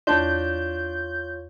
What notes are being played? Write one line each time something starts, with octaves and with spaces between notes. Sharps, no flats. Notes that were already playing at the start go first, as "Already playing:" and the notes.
E2 D4 F4 C#5 A5 C6 G6